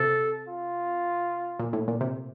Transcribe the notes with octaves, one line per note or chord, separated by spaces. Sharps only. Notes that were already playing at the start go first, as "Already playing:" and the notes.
Already playing: C3 A4
F4
A#2
A2
A#2
C3